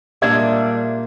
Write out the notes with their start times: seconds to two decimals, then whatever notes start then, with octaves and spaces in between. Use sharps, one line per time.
0.22 A#2 G3 G#3 D4 E5 G#6